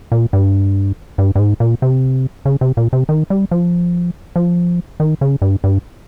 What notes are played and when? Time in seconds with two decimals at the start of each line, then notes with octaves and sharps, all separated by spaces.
0.12 A#2
0.33 G2
1.18 G2
1.35 G2
1.39 G#2
1.60 A#2
1.82 C3
2.45 C#3
2.61 C3
2.77 A#2
2.93 C3
3.09 D#3
3.30 G3
3.51 F3
4.36 F3
5.00 D#3
5.21 C#3
5.42 G2
5.64 G2